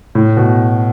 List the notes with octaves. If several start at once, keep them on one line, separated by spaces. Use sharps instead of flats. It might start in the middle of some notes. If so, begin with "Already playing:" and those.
A2
B2